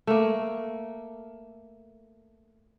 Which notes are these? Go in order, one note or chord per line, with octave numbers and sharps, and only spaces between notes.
A3 A#3